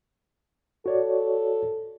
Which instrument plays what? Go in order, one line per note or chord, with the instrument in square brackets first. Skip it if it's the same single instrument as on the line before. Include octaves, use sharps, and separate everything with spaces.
[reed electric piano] F#4 C#5 D5 [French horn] A4